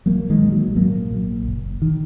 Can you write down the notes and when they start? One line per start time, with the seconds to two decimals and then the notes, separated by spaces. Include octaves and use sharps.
0.06 A#1 F#3 A#3
0.30 D#3 G#3
0.42 A#2
0.52 F#3
0.76 G#2 F#3 A#3
1.11 A#1
1.47 F#1
1.82 D#3